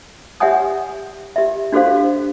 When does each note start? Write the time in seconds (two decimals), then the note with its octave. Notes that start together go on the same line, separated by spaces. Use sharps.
0.40 G4 C#5 E5 F#5 G#5 D#6
1.36 G4 E5
1.72 D4 F#4 G4 A4 C5 F5